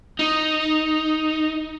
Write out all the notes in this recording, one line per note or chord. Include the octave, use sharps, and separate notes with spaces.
D#4